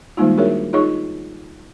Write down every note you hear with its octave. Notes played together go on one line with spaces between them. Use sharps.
D#3 G3 G#3 A#3 D#4 F4
D4 F#4 G#4 A#4 C#5 E5
D#4 F4 G#4 C#5 D#5 C#6